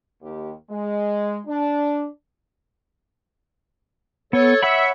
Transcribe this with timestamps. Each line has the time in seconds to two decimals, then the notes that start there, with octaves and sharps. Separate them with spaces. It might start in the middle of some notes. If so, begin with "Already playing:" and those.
0.21 D#2 G4
0.70 G#3
1.46 D4
4.33 B3 A4 C#5
4.63 C#5 E5 F#5 B5